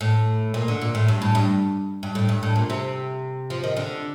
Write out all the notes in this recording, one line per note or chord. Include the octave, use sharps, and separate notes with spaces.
A2
A#2
D3
A#2
A2
G2
A2
G2
G2
A2
G2
A2
A#2
C3
F3
D#3
D3